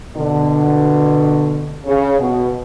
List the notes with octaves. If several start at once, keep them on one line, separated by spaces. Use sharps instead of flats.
B2 D3
C#3
B2